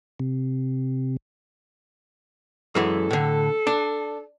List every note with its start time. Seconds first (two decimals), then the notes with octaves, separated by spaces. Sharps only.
0.20 C3
2.75 F#2 E3 G#3 A4
3.11 A2 D3
3.67 D4